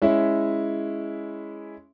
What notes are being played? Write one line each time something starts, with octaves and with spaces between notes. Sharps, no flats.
G#3 C#4 E4 C#5 E5